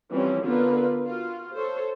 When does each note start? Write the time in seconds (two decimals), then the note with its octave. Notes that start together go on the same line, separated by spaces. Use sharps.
0.11 E3 F3 G3 C4 C#4
0.43 D3 B3 F4 A#4 B4
1.06 F4 F#4
1.54 A4 C5 C#5